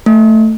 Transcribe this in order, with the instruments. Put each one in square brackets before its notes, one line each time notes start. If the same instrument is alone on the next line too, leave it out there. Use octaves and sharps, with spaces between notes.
[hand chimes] A3